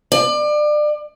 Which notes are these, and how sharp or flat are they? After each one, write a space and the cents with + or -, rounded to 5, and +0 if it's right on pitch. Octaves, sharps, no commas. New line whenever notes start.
D5 +30